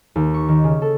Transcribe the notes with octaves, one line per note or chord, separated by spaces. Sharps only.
D#2
C#6
D#3
C#3
A4